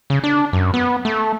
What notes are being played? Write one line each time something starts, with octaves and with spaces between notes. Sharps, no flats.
C#3
D4
F#2
B3
A3